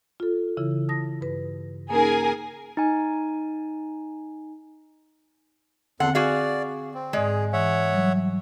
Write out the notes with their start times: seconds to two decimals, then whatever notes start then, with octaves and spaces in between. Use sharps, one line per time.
0.20 F4 A4
0.57 C#3 E3 E4
0.89 A5 D#6 A#6
1.21 G2 B4
1.90 A#3 C#4 D#4 G#4 A#4 G#5
2.77 D#4 G#5
6.00 E2 D3 C4 A4 F#5 C6
6.15 F#4 G#4 D5 F5
6.94 C4
7.13 G#2 G#3 G#4 D5
7.53 E3 C#5 E5 F#5
7.92 F#3 G3